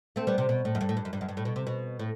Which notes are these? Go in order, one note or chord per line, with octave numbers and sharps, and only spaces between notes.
A3 C4
G3 B3
C3
B2
A2
F#2
G2
A2
G2
F#2
G2
F#2
G2
A2
B2
C3
B2
A2